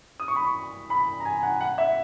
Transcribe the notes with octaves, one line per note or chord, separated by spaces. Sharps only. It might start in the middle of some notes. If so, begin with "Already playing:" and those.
D#6
C#6
B5
C#6
B5
A#5
G#5
F#5
F#5
E5